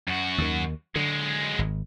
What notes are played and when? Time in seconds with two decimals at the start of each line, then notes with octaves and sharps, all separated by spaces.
0.08 F#2 F#4
0.38 D#2 D#3
0.96 D3 F#3 G#3
1.59 G#1